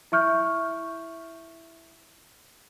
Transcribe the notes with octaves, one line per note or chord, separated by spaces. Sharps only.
E4 E5 C#6 F6 G6